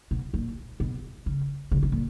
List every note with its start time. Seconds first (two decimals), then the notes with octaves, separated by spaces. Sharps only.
0.11 B2
0.34 A#2
0.80 B2
1.26 C#3
1.72 C#3
1.83 B2
1.92 A#2